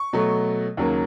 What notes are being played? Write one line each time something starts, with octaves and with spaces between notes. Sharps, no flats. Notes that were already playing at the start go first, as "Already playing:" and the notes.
Already playing: C#6
B2 F#3 A3
D#2 C#3 F#3 A#3